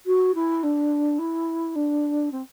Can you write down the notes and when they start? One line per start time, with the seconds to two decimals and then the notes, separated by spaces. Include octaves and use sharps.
0.06 F#4
0.35 E4
0.63 D4
1.19 E4
1.76 D4
2.32 C4